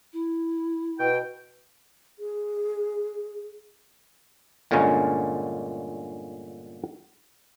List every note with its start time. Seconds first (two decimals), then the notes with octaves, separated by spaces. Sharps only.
0.13 E4
0.99 B2 G5
2.19 G#4
4.71 G1 A#2 D3 G#3 C#4 A#5